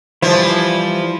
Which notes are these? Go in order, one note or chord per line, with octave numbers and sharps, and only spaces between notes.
E3 F3 G3 E4